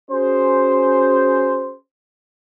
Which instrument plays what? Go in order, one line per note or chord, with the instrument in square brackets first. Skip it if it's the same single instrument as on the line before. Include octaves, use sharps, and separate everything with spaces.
[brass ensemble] C#4 F#4 G#4 C5